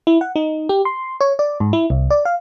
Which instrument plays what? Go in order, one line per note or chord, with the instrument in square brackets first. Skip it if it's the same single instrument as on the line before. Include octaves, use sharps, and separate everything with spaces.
[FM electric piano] E4
F#5
D#4
G4
C6
C#5
D5
G#2
E4
C2
D5
F5